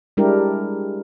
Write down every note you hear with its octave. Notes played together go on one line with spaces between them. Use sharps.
G3 G#3 D4 E4 G4 A#4